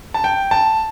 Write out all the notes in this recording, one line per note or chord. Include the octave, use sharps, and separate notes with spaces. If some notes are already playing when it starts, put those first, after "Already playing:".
A5
G5
A5